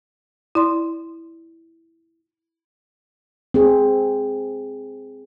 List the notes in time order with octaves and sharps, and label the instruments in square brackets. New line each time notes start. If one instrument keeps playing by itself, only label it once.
[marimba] E4 D5 C6
[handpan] C4 G#4